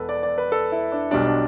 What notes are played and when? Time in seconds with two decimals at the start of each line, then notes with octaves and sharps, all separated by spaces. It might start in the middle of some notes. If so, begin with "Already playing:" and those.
Already playing: E1 E2 A4 B4
0.09 D5
0.23 D5
0.38 B4
0.52 A4
0.72 E4
0.92 D4
1.11 B1 B2 G3 D4
1.26 D4